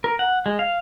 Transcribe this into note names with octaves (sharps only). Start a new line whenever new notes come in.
A#4
F#5
G#3
F5